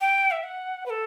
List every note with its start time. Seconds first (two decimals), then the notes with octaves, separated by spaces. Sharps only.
0.01 G5
0.31 E5
0.44 F#5
0.86 B4
0.90 A4